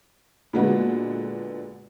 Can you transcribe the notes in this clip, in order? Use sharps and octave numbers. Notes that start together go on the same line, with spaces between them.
A#2 D3 G#3 B3 F#4